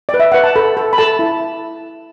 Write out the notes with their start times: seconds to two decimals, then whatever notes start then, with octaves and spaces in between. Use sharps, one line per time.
0.09 D5
0.14 B4
0.20 E5
0.32 B4 F#5
0.44 A5
0.56 A4 B5
0.77 A4
0.93 B5
0.98 A4 A5
1.19 E4